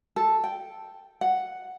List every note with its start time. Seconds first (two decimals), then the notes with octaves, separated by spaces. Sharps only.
0.16 A4
0.44 G5
1.21 F#5